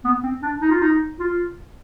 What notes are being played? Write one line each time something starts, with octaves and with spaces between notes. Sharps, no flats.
B3
C4
D4
D#4
F4
D#4
F4